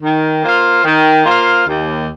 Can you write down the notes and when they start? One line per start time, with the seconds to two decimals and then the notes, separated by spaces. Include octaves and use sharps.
0.02 D#3
0.44 A#3 F4 C5 F5
0.84 D#3
1.25 A#3 F4 C5 F5
1.66 D#2